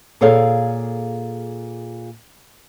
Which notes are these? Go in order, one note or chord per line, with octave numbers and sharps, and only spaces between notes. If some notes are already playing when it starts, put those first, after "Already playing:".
A#2 G#4 A4 C#5 F5